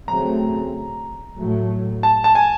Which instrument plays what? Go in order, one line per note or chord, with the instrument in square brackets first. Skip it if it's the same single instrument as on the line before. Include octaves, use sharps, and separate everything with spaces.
[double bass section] C#3 F#3 A3 C4 [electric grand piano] A#5
[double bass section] A2 F#3 A3
[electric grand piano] A5
A5
G#5